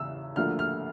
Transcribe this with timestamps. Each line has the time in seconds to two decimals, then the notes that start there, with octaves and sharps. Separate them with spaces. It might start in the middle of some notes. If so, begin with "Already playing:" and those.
Already playing: E2 C#3 E6
0.36 D2 D3 F3 A#3 F6
0.59 F6